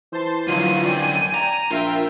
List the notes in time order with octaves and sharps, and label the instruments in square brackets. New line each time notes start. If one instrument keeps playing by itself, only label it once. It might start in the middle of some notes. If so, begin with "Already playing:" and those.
[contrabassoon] E3 [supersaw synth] C5 A5 C6
[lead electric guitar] F#2 D3 [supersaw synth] F3 F#3 F4 [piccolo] D#7
[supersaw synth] D5 G5 G#5
[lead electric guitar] A#5
[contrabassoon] A#1 [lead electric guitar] F4 [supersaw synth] A#4 E5 G5